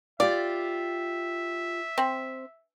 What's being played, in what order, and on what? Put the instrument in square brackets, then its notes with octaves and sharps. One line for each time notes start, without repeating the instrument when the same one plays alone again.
[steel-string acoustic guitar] F4 G4 [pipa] D5 [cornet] E5
[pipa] C4